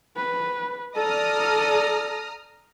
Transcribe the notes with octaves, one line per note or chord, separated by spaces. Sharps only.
B4
A4 D5 A#5 D#6 F6